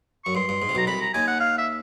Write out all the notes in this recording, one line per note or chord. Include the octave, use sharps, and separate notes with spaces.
F#2 C#6
G2 C6
G2
G#2
C3
B1 B2 A#5
C2 C3 B5
A#5
D#2 D#3 G#5
F#5
F5
E5